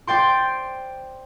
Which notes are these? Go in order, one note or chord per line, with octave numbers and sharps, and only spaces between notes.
C5 D5 G5 C6